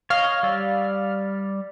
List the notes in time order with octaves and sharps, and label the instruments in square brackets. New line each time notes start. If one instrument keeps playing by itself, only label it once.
[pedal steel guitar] C#5 D#5 [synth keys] F5 F6
[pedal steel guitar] G3 D5 E6